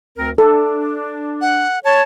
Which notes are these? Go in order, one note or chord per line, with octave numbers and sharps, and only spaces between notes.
D2 C4 A#4
D4 A4
F#5
C#5 A5